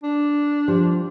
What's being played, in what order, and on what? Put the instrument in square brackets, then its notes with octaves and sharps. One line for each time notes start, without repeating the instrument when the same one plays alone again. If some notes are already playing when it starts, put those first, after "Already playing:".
[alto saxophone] D4
[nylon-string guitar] F3 [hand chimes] G4